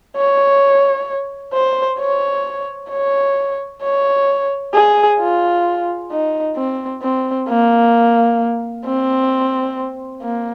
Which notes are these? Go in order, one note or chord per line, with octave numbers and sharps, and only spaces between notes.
C#5
C5
C#5
C#5
C#5
G#4
F4
D#4
C4
C4
A#3
C4
A#3